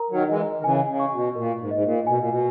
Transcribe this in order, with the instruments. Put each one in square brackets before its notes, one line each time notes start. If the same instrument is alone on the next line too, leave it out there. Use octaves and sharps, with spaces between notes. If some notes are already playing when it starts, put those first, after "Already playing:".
Already playing: [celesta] A#4 A#5
[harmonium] D#3 F#3
[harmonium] E3 G#3 [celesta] D#5
[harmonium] D#3
[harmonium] C#3 E3 [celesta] G#5
[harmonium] C#3
[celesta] C#6
[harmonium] B2
[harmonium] A#2 [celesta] A#4
[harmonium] G#2
[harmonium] G#2 [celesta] D#5
[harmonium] A#2
[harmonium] B2 [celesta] G#5
[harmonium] A#2
B2